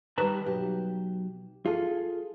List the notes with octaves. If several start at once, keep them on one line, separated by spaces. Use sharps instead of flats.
D#3 G3 B4 A5 A#5
B1 G4
F4 G#4 A4